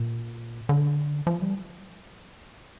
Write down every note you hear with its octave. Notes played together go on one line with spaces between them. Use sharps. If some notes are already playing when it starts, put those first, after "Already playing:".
Already playing: A#2
D3
F3
G3